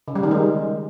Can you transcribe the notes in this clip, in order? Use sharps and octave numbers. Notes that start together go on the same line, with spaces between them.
C#3
G3
D#3
G#3